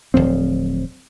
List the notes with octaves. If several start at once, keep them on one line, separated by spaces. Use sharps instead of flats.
D1 G1 F3 C4